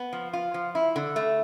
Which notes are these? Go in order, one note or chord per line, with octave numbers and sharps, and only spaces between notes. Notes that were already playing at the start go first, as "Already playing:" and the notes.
Already playing: B3
F3
F4
F3
E4
D3
A3